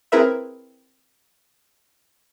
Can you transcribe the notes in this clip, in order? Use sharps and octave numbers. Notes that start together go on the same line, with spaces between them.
C4 E4 G#4 A#4 B4 E5